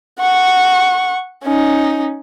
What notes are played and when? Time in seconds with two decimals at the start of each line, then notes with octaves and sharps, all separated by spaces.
0.20 F#5 C#6
1.44 C#4 D#4